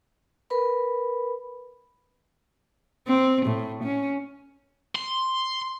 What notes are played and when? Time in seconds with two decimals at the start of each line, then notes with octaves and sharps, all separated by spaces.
0.50 A#4 B4 B5
3.07 C4
3.45 A2
3.83 C#4
4.96 C6